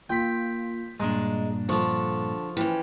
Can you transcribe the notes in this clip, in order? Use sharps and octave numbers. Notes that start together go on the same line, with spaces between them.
A#3 F4 G5 B5 G6
G2 A#2 G#3 D4 A#5
D3 F3 A4 C#6
E3 C#4 E4 B4 G5